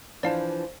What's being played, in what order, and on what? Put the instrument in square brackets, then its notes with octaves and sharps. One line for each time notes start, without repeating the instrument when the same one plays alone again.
[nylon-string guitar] E3 F3 D4 [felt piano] C5 [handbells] D5 F5 A5